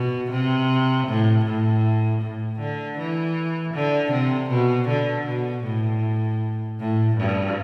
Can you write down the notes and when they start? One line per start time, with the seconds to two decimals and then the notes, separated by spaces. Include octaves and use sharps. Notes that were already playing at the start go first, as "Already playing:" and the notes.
Already playing: B2
0.31 C3
1.07 A2
1.45 A2
2.21 A2
2.60 D3
2.98 E3
3.74 D3
4.12 C3
4.50 B2
4.89 D3
5.27 B2
5.64 A2
6.79 A2
7.17 G2